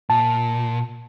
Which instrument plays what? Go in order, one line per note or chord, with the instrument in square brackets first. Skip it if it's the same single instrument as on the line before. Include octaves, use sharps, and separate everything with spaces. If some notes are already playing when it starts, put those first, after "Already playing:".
[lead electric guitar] A#2 [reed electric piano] A5